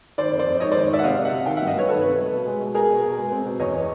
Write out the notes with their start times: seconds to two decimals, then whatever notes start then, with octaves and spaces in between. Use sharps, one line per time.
0.18 D#3 C5 D5
0.33 F2
0.39 C5 D5
0.47 F2
0.60 G#2 C#5 D#5
0.72 C5 D5
0.75 D#3
0.89 G#2 D5 E5
0.99 F#5
1.04 C3 D#5 F5
1.18 C3
1.25 E5 F#5
1.33 C3
1.46 D#3 F5 G5
1.57 E5 F#5
1.60 G2
1.67 D#5 F5
1.75 G2 B4 C#5
1.89 D#3 A4 B4
2.03 C3
2.17 G3
2.32 B2
2.46 G#3
2.60 B2
2.75 B3 G#4 A#4
2.89 B2
3.03 B2
3.17 G#3
3.32 C4
3.45 B2
3.59 E2 C#5 D#5
3.74 E3